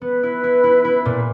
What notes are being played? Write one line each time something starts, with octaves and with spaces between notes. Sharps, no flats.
B3 B4
E4
E4
E4
E4
A#2